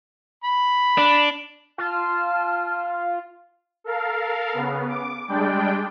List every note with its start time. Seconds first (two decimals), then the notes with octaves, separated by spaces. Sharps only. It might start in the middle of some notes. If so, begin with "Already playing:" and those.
0.44 B5
0.98 D4
1.78 F4 A5 F6
3.84 A4 A#4 F5
4.53 C#3 B3
4.88 D6
5.28 G3 G#3 D4 D5 G5